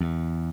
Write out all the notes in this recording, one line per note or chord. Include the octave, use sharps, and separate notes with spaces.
E2